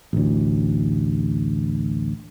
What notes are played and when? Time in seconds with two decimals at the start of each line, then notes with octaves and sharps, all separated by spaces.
0.13 A1 D2